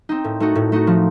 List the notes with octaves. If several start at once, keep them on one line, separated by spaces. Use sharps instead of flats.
C4 D#4
A2
A3 D#4 F#4
A2
A3 D#4 F#4
F3